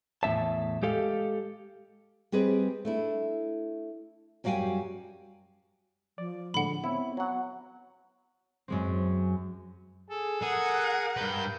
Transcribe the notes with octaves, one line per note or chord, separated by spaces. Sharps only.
E2 A2 A#3 E5 A5
G#3 G4 A4 F5
G3 C4 G#4 B4 D#5
A3 D4 E4
F#2 G3 F#4 F5 G5 G#5
F3 D5
A2 D3 G#3 F#5 B5
B3 C4 E4 C#5
F#3 F#5
F#2 G#3 C4
G#4 A4
G#4 A#4 F#5
G2 B4 G6